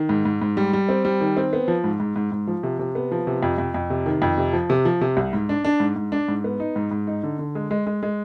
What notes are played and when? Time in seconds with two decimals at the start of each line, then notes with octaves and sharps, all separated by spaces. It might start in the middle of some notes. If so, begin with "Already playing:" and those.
Already playing: D#3
0.09 G#2
0.25 G#2
0.42 G#2
0.57 G3
0.73 G3
0.89 C4
1.05 G3
1.21 D#3
1.37 C4
1.53 B3
1.68 F3
1.84 G#2
2.00 G#2
2.16 G#2
2.32 G#2
2.47 F3
2.63 C3
2.79 C3
2.95 B3
3.11 F3
3.27 C3
3.43 F2
3.58 F2
3.74 F2
3.90 C3
4.06 D#3
4.22 F2
4.38 C3
4.53 F3
4.70 C3
4.85 F3
5.01 C3
5.17 C2
5.33 G#2
5.49 D4
5.65 D4
5.80 G#2
5.96 G#2
6.12 D4
6.28 G#2
6.44 B3
6.60 D#4
6.76 G#2
6.91 G#2
7.07 D#4
7.23 D3
7.39 D3
7.55 G#3
7.71 G#3
7.87 G#3
8.03 G#3